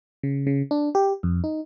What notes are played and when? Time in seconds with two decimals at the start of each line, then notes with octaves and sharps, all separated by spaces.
0.23 C#3
0.47 C#3
0.71 D4
0.95 G4
1.23 F2
1.44 D#4